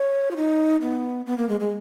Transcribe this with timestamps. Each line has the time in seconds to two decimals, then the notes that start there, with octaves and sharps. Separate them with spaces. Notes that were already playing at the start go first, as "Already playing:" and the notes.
Already playing: C#5
0.31 F4
0.36 D#4
0.82 B3
1.26 B3
1.38 A#3
1.49 G#3
1.60 G#3